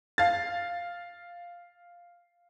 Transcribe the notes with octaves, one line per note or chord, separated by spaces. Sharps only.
F5 A6